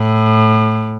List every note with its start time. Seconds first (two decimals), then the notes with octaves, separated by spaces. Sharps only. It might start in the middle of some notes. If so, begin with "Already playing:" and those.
Already playing: A2